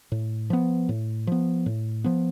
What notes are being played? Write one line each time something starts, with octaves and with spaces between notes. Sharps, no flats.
A2
F3 B3
A2
F3 B3
A2
F3 B3